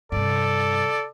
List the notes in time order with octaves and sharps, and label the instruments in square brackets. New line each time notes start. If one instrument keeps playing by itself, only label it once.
[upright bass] G2 C3 [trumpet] A4 [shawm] D5